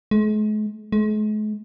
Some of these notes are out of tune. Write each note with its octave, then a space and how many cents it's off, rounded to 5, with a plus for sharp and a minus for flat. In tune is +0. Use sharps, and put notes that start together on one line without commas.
G#3 +45
G#3 +45